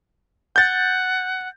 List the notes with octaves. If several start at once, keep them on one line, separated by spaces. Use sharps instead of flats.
F#5 G6 A6